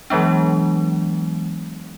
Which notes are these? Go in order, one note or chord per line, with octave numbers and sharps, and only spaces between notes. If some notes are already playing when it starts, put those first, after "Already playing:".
E3 F#3 G#3 B3 D4